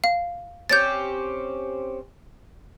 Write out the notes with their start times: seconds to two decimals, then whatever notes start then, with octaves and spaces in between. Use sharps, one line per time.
0.04 F5
0.70 C4 C#4 G4 G6 A6